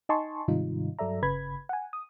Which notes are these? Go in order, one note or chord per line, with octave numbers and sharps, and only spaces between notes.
D#4 D#5 G#5 A5 C6 C#6
G#2 C3 D#3 G3 D#4 F4
G2 F#3 A4 D5 E5 A#5
G1 C#3 B4 B5 G#6
F#5 G#5
D#6